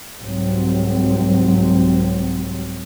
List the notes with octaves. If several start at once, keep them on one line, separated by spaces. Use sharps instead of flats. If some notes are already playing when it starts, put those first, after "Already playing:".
C2 G#2 F#3 C4